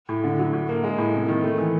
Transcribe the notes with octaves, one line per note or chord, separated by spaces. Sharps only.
A2
D3
F#3
A2
A#3
G#3
A2
C3
D#3
A3
E3